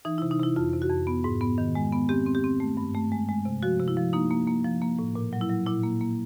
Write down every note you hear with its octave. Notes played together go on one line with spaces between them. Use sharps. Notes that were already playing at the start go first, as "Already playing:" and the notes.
E3 D#4
E4
C3
D#4
C3 E4
F2 F4
C3
F#4
F2
B3
G#2
B3
D#3
G#3
B3
C4 G4
C4
G4
C4
A3
G2
A3
G#3
G#3
C3
F3 F#4
C3
E4
F3
A#3 D#4
A#3
A#3
F3
A#3
A2
A#2
F#3
E4
F#3
A#2 E4
A#3
A#3